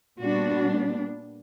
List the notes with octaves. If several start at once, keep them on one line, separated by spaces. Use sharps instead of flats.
A#2 G3 B3 D4 F#4